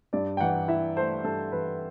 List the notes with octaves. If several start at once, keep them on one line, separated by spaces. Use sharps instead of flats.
G2 D5
G5
E3 F#5
E4 E5
A3 C5
G2 A4
E3 B4